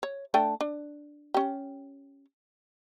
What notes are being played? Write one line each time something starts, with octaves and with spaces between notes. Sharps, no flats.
C#5
A3 D4 G5
D4
C#4 G4